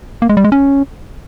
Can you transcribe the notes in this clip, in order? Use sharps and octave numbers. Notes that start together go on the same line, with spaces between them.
A#3
G#3
G3
G#3
C#4